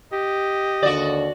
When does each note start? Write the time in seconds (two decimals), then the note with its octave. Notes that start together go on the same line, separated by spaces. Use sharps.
0.12 G4 D#5
0.83 D#2 D3 F#4 D5